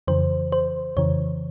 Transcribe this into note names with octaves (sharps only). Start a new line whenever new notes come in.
F2 C#3 E3 C5
C5
F2 C#3 E3 C#5